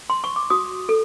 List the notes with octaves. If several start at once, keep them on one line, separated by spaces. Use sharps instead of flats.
C6
C#6
D6
F#4 D#6
A4